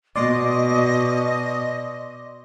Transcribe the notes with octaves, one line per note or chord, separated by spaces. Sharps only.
B2 D5 D#5 C6 D6